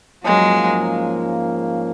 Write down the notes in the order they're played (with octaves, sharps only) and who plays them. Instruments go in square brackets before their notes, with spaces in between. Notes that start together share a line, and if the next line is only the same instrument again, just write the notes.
[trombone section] G#2 F3 A#3 C#4 [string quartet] F#3 G#3